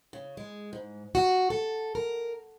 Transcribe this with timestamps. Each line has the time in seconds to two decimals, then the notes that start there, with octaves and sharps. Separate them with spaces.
0.13 C#3
0.37 G#3
0.73 G#2
1.15 F#4
1.50 A4
1.95 A#4